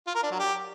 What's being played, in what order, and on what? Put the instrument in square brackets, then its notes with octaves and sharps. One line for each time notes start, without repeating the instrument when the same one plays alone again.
[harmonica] F4
A#4
D4
F#3
G4